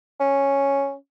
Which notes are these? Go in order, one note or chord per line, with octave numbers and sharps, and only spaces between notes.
C#4